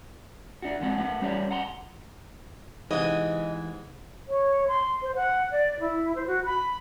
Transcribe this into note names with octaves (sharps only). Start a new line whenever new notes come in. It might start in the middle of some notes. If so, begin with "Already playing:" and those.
D4 F#4
G#2 F3 C4 D4 F#5
A3 B3 F#5
G3 C#4 G4 C#5 D5
F#5 A#5 C6
G#2 C3 E3 D#5
C#5
C6
C5
F#5
D5
E4
C5
F#4
B5